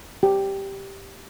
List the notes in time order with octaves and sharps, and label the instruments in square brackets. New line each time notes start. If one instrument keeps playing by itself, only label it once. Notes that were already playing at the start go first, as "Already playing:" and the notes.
[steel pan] G4